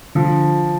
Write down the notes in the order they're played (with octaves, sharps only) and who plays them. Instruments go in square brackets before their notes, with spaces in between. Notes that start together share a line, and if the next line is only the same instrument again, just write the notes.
[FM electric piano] D3 [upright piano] F3